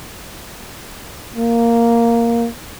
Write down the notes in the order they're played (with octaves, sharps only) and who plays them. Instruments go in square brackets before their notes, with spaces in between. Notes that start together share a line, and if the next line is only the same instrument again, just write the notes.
[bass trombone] A#3